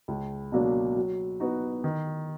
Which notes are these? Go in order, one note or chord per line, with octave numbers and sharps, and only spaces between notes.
C#2
B2 F#3 A#3 D4
F#3
B3 D#4 F#4
D#3